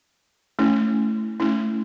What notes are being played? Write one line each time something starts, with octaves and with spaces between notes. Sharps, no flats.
A3 C#4 E4
A3 C#4 E4